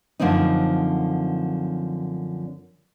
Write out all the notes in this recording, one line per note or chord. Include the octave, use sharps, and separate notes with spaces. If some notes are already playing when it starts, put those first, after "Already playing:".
F#2 D3 F3 A3 C4 D#4